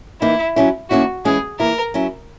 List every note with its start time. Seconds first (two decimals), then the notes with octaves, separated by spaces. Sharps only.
0.21 E3 A#3 D#4 E4
0.56 F#3 C#4 E4
0.90 D#3 F#3 A#3 C#4 E4 F#4
1.25 E3 G#3 C#4 E4 G#4
1.59 E3 A#3 E4 A#4
1.94 F#3 C#4 E4